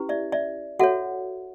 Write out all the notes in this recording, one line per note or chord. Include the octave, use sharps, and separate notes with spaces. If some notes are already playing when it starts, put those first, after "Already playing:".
Already playing: C#4 E4 G4 B4
D5 E5
D5 E5
F#4 A4 C#5 E5 F#5